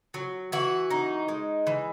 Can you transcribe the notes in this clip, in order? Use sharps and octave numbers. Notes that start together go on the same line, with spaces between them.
F#3
E3 F#4
D#4
G#3
E3